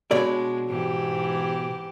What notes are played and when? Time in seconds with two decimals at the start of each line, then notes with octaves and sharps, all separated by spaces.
0.11 B2 G#3 D4 C#5 D5
0.68 G#2 E3 G4